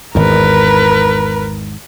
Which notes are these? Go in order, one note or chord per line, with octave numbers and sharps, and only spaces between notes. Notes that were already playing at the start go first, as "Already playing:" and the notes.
G#1 E2 A#4 B4